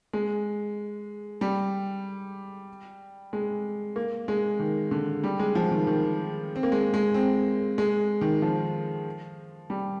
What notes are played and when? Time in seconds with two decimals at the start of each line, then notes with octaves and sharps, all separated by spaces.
0.13 G#3
1.41 G3
3.33 G#3
3.96 A#3
4.28 G#3
4.59 D#3
4.91 D3
5.24 G3
5.40 G#3
5.55 F3
5.71 D#3
5.87 D#3
6.56 C4
6.63 A#3
6.72 G#3
6.94 G#3
7.14 C4
7.78 G#3
8.21 D#3
8.42 F3
9.70 G3